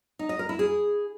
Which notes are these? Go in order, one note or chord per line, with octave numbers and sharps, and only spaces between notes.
D#4
D#5
A#4
E4
G#4